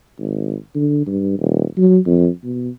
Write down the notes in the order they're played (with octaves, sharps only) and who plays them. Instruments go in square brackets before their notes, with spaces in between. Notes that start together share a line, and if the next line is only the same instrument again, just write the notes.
[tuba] G#1
D3
G2
D#1
F#3
F2
B2